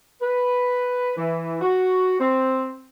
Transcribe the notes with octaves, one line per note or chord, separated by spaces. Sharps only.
B4
E3
F#4
C4